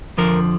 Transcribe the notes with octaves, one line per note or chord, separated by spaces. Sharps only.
F2 D3 F3 A#4